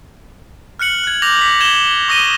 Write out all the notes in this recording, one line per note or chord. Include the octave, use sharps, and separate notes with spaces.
F6 F#6 C#7 F#7
F#6 G#6
D6 G6 A#6 F7 F#7
B6
G#6 E7 G7
C#6 D#6 A#6 D#7 G7